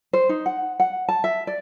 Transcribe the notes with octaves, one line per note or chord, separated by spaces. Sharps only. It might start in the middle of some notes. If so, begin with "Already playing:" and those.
C5
D#4
F#5
F#5
A5
E5
D5